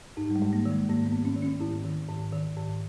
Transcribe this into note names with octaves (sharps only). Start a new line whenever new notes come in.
G#2 D#4
G3
G#3
G#2
A#3
D#3
G#3
G#2 A#3
B3
G#2
C#4
D#3
C#4
G#2 E4
D#3
G#2
D#3
G#2